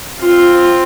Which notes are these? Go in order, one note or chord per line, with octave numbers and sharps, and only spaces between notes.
C4 F4